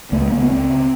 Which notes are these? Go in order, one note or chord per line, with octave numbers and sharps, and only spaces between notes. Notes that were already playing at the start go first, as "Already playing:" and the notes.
C#2 A3
G#3
C#3 A#3
B3
C#2 C4
C#3